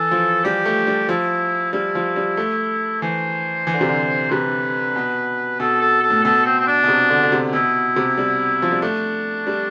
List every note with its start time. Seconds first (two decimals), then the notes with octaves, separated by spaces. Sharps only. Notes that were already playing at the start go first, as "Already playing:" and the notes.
Already playing: E3 A4
0.11 F3
0.44 G3 G4
0.65 A3
0.87 G3
1.09 F3 E4
1.73 G3 E4
1.95 F3
2.16 G3
2.37 A3
3.02 E3 C5
3.67 E3
3.74 D3
3.81 C3
3.89 D3
4.31 C3 B4
4.96 B2
5.60 B2 A4
5.81 A4
6.03 A4
6.10 A2
6.24 B2 A4
6.45 C4
6.59 C4
6.67 D4
6.84 B2
6.89 C3
7.10 D3
7.23 D3
7.32 C3
7.53 B2 E4
7.96 C3
8.18 G3
8.62 F3
8.72 G3
8.82 A3 D4
9.47 G3